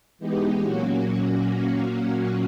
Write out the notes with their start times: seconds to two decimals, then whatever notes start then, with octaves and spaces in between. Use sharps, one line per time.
0.19 E3 G#3 B3 D#4 G4
0.59 A#2 F#3 A#3 C#4 F#4